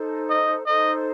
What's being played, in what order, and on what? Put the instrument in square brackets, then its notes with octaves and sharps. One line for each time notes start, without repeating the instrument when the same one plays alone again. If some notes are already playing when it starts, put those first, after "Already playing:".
Already playing: [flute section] D#4 A4 C5
[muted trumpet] D#5
[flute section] D#4 A4 C5 [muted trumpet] D#5